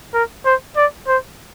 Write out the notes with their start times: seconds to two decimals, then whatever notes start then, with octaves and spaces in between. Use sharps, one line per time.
0.14 A#4
0.45 C5
0.77 D5
1.08 C5